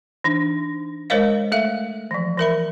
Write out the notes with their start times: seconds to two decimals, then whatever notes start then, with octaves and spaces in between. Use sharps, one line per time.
0.24 E3 D4 D#4
1.10 G#3 A#4 C5 C#5 D#5 F5
1.52 A3 A4 E5 F5
2.11 E3 F3
2.38 E3 A#4 E5 B5